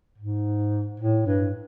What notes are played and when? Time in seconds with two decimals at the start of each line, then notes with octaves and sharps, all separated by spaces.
0.18 G#2
1.00 A2
1.26 G2